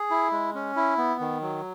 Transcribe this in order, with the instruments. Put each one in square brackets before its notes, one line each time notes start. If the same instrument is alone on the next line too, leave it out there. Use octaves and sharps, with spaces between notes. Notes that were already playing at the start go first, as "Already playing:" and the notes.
Already playing: [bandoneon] G#4
E4
G#3
C#4
E4
B3
D#3
F#3